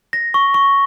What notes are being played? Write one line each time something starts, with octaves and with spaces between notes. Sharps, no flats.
A#6
C#6
C#6